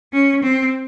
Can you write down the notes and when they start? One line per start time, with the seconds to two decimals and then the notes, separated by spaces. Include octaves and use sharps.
0.13 C#4
0.44 C4